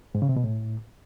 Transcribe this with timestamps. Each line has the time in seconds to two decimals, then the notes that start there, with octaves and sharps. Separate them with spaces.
0.15 G#2
0.22 C#3
0.29 C3
0.36 B2
0.44 A2